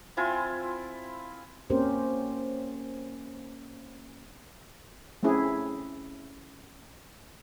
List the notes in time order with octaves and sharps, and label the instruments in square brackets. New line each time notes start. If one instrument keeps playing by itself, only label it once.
[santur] C4 E4 F4 G#5
[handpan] A#3 C4 C#4 G4 A#4 C5
[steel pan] A3 C4 C#4 E4 G#4